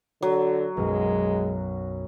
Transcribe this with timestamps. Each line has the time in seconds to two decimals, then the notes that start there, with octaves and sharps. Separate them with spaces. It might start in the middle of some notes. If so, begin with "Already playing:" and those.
0.22 D3 F#3
0.77 B1 F#2 G#3